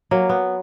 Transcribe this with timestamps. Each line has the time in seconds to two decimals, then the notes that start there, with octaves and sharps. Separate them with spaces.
0.11 F#3 A#3
0.29 B3